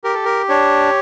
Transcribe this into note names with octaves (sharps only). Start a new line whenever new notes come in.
G4 A#4
A4
A#4
D4 C#5